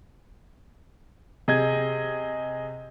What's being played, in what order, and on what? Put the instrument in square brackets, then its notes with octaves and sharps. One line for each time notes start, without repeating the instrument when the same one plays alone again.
[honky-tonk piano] C3 [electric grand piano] G#4 D#5 G#6